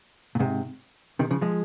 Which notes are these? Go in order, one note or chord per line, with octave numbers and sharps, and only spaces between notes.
A#2
G#2 C3
C3 D#3
C#3 F3
F3 G#3